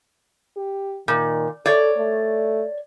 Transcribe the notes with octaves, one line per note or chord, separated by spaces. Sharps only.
G4
A#2 D#3
A4 C#5 D5
A3